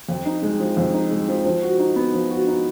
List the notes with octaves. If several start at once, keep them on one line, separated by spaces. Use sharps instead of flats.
F2
D#4
G#3
F3
F2
D#4
G#3
F3
F3
F#4
D#4
B3
F3
F#4
D#4